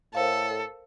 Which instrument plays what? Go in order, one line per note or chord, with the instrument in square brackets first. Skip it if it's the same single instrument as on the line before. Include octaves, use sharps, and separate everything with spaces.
[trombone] A2 [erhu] A4 [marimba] A#4 C5 F5